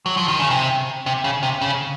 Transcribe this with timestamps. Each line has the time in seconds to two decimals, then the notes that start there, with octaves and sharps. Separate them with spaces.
0.06 F#3
0.17 F3
0.28 D#3
0.39 C#3
0.50 C3
1.06 C3
1.24 C#3
1.43 C3
1.61 C#3